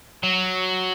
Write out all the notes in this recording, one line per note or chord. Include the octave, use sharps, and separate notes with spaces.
F#3